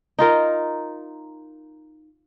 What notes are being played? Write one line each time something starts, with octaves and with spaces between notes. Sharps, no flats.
D#4 F4 A#4